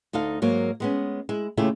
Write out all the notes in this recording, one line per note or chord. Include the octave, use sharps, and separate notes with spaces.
D2 D#4 A4 F5
G#2 F#3 A#3
G#3 B3 C#4
G#3 E4
D#2 C#3 A3 E4 F4 G4